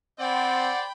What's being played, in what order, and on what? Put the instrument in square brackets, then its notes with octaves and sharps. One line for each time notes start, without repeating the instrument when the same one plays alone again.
[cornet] C4 [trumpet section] C5 D5 [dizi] F#5 [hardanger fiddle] G5 B5